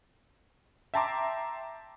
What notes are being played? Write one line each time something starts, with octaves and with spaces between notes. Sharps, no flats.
E5 G5 A5 A#5 C6 D6